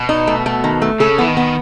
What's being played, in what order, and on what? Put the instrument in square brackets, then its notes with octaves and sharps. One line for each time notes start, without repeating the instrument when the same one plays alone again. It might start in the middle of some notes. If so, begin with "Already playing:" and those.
Already playing: [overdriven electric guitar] B2
[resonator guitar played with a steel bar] D#4
A3
A3
D#3
A3
[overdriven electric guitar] C#3 [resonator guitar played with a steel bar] A4
[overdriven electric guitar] E3 [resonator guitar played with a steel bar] B3
[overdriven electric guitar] D#3
[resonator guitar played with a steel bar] B3